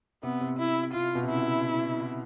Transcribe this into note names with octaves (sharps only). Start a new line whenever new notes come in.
C3 B3
C3
E4
C3 F4
B2
C3
C#3 E4